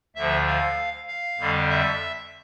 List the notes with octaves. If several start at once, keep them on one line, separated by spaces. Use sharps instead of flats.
D2 D3 F3 E5
F5
F5
F2 D3 G3
E5